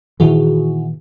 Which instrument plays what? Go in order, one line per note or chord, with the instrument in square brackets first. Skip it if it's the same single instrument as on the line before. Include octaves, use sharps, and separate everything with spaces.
[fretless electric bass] A#2 D#3 E3 [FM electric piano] E4 F#4 G#4